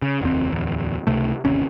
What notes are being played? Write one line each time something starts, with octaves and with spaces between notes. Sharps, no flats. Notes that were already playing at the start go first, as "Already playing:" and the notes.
C#3
F1 D#2 C4
D1 E2
C#2 C3 A3
G1 D#2 C3 C#4